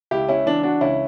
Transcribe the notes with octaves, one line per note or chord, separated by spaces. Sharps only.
C#2 E4 G4
C#4 E4
E3 D4
D4 F#4
C#2 C#4 E4